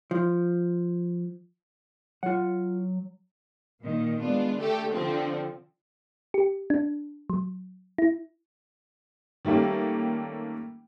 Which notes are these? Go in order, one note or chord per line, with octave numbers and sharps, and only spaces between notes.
F3
F#3 F4 F#5
A#2 D#3
G#3 B3 D4 F4
D3 A3 G4 A4
D3 F3 C4
G4
D4
F#3
E4
D#3 G3 A3 A#3 C#4